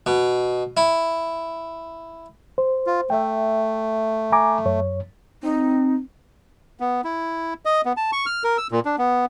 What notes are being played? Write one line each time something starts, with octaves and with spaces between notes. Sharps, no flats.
B2
E4
C5
F4
A3 E5 G5
G#5 A#5 D6
F#2 C#5
C4 D#4
B3
E4
D#5
B3
A5
C#6
F6
A#4
E6
A#2
D4
B3